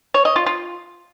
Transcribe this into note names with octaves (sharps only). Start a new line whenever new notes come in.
C#5
D#5
F4
F4